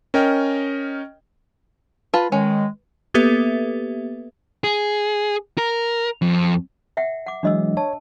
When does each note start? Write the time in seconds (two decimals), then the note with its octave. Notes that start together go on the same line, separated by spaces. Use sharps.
0.14 C#4 A#4 D#5 G5
2.14 F4 B4 A5
2.32 D#3 G#3 C#4
3.14 A#3 B3 G4 A4 B4 E5
4.64 G#4
5.58 A#4
6.22 F2
6.97 E5 F#5 G5
7.26 F#5 D6
7.43 E3 F#3 G#3 D4 D#5 E6
7.77 C#5 A5